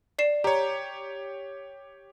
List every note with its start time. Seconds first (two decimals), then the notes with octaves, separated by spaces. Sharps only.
0.19 D5 C7 E7
0.44 G4 C#5 A#5